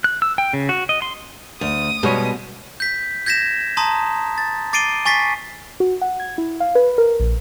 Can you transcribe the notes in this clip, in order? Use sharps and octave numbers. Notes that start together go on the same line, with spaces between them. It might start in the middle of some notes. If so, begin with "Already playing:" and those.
F#6
E6
G5
C#3
F#4
D#5
C6
D2 D#6
B2 G3 G#3 C#5
G6 B6
G6 G#6 A#6 B6 E7
A5 A#5 C6 D#6
A6
D6 A6 C7 D7 D#7 G7
G#5 C#6 A6 B6 C7
F#4
F#5
G#6
E4
F5
B4
A#4
A#1